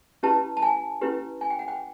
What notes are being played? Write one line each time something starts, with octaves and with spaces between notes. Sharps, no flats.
C#4 E4 G4 B4 A5
A5
G#5
C#4 E4 G4 B4
G#5
G5
F#5
G5